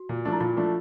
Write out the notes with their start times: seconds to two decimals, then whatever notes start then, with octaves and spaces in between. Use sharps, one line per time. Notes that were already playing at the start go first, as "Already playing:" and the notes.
Already playing: F#4
0.09 A#2
0.25 F3 A3 D4
0.33 E4
0.40 A#2 F4
0.57 F3 A3 D4